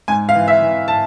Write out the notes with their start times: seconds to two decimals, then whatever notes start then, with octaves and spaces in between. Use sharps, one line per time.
0.08 G#2 G#5
0.29 F5
0.35 E3
0.48 E5
0.61 E3
0.88 A5